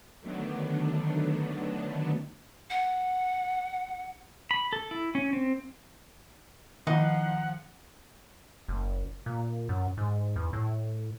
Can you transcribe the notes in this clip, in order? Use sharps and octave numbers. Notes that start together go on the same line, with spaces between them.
D3 D#3 F#3 A3 B3 D4
F#5
B5
A4
E4
C#4
C4
D#3 F3 D#4 E4 F#5
F#1
A#2
F#2
G#2
E2
A2